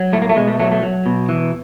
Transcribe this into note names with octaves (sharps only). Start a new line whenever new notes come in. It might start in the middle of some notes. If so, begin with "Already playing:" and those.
Already playing: F#3
A2 A3
A#3
A3
B2 G#3
A3
F#3 A3
A3
F#3
B2
E3